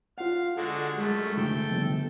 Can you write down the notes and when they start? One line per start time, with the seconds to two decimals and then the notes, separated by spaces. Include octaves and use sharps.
0.18 F4 F5 F#5
0.56 D3 G#3 F#4 A4
0.98 F#2 G#3 A3
1.37 D2 A4 G5
1.71 G1